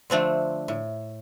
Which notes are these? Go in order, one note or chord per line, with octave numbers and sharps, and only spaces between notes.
D3 F3 A3 C4 D4
A2